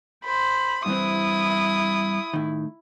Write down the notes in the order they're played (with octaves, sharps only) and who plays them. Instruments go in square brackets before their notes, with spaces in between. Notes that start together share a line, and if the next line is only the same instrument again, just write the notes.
[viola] C5 [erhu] B5
[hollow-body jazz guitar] G2 E3 C4 [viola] E4 [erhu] D#6
[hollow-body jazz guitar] A2 D#3